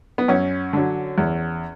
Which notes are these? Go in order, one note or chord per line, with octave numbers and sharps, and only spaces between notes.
B3
F#2 C#4
D3 F#3
E2